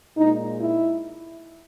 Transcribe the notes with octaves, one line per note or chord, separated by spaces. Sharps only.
A#2 G#3 D#4
E4